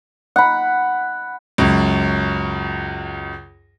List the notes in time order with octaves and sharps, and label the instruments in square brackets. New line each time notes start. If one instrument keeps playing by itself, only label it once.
[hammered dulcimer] F#5 B5
[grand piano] C#2 F#2